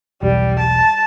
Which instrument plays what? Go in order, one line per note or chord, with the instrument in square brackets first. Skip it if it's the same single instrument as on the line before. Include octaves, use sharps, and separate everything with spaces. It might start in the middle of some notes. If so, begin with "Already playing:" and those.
[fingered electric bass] E1 B1 [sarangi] G3
[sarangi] A5